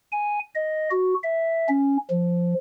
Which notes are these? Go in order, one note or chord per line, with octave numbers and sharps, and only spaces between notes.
G#5
D#5
F#4
E5
C#4
F3